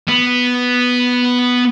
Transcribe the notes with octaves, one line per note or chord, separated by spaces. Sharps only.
B3